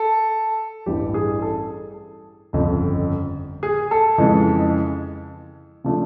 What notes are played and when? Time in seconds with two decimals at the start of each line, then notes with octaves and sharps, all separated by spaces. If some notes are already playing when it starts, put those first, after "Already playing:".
Already playing: A4
0.86 A1 G2 E3 G4
1.14 G#4
1.42 A4
2.53 G1 F2 C#3
3.63 G#4
3.91 A4
4.18 F2 C#3 E3 G#3
5.84 C#3 F3 A3 D4